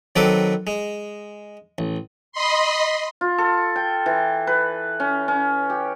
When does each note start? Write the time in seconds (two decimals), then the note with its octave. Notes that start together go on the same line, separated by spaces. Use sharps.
0.16 D#3 F#3 C4 A4 B4 D6
0.67 G#3
1.78 A1
2.32 D#5 B5 C6
3.21 F4
3.38 A4
3.76 G5
4.06 E3
4.47 B4
5.00 C#4
5.28 C#4
5.70 G4